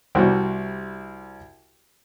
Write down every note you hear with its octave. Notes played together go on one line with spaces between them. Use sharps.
C2 C3 G3 F#4 G5